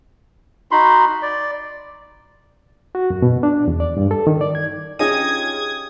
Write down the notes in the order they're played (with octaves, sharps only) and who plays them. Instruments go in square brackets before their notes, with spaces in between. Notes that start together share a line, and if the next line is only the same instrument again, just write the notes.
[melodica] D#4 F#4 B5 C6
D5
[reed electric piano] F#4
F#2
B2
D4
E2
D5
G2
A4
D#3
D5
G#6
[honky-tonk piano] C#4 F4 G#4 [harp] D#4 G4 D#5 [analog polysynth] D#6 G#6